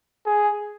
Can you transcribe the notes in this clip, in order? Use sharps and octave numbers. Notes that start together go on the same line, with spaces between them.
G#4